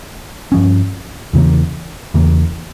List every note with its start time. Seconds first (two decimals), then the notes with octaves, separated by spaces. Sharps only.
0.52 G2 F3 C#4
1.33 E2 C#3 E3 A#3
2.14 E2 C#3 E3 A#3